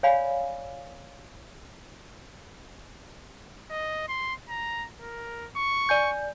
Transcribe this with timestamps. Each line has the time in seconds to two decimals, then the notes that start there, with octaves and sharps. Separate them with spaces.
0.03 C#5 D5 F5 G#5 B5
3.71 D#5
4.08 C6
4.49 A#5
5.01 A#4
5.56 C#6
5.89 D5 G#5 G6